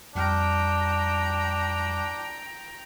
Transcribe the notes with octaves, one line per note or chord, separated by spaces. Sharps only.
F2 G3 D4 G5 A#5 F6